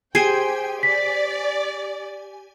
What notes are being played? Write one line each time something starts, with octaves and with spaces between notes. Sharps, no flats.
G4 G#4 C5 G5 G#5 G#6 C7 D#7
D5 B6